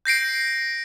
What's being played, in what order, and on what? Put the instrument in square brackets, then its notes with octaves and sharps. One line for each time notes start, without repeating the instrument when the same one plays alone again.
[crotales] G6 A#6 C7 D7